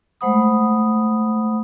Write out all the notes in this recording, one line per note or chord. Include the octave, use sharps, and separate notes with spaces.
G#3 A3 C5 F#5 B5 D#6